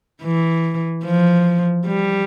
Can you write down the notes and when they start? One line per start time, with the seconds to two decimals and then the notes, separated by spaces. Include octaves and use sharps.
0.23 E3
1.05 F3
1.87 G3